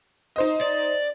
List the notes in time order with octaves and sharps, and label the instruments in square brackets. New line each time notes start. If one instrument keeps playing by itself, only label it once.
[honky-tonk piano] D#4 C5 D#5
[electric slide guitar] D5